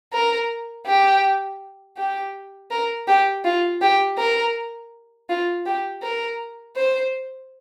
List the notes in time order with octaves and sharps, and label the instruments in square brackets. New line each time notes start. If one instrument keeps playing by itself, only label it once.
[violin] A#4
G4
G4
A#4
G4
F4
G4
A#4
F4
G4
A#4
C5